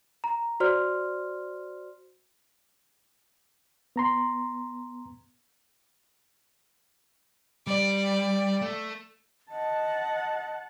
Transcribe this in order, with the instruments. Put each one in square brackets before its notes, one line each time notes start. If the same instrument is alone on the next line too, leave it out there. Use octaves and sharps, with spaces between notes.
[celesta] A#5
F#4 C5 D5 C6 F6
[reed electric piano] B3 A#5 C6
[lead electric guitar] G3 [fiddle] D5
[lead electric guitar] A3
[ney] D#5 [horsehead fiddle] F#5 A5